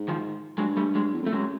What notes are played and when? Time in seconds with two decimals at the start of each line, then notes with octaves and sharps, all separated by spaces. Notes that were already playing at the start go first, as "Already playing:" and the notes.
Already playing: G#2
0.08 D#3 F3
0.58 G2 F#3 G#3
0.77 G3 A3
0.95 F#3 G#3
1.14 E2
1.23 F2 A3
1.33 F#2 F#3 G#3